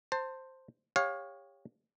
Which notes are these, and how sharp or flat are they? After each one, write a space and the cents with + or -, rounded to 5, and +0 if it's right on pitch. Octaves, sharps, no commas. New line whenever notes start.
C5 +0 A5 +30
G4 +30 C#5 -5 F5 +25